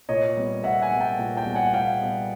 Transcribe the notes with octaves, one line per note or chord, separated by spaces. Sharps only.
A#2 C#5 D#5
G3 B3
A#2 E5 F#5
F#5 G#5
G3 B3
G5 A5
A#2
G5 A5
G3 B3
F#5 G#5
A#2 F5 G5
G3 B3